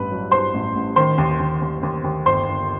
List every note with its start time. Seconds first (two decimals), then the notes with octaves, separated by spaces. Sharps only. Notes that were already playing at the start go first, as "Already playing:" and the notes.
Already playing: A1 G2 B4 B5
0.11 F#3
0.31 G2 C5 C6
0.54 A1
0.75 A1
0.96 D#3 C5 C6
1.18 D#2
1.40 D#2
1.62 D#2
1.83 D#2
2.04 D#2
2.26 G1 C5 C6
2.47 G1